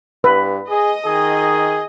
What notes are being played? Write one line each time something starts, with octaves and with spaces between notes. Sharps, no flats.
G2 B4
G#4 D#5
D#3 G#4